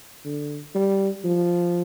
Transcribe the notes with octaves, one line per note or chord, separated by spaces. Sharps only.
D3
G3
F3